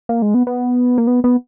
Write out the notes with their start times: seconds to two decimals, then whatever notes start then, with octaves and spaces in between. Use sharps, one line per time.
0.09 A#3
0.22 G#3
0.34 B3
0.47 B3
0.98 A#3
1.07 B3
1.24 B3